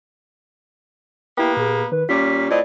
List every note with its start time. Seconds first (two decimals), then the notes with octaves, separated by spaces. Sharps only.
1.38 A#3 B3 E4 G4 G5
1.57 A#2 G#4
1.92 D#3 B4
2.09 A#2 G3 C#4 F4 D6 B6
2.51 A2 C4 D5 D#5